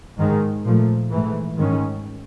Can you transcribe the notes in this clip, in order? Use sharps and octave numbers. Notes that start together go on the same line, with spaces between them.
G#2 D#3 G#3
A#2 F3 A3
G#2 E3 A3
G#2 D#3 G#3 C#4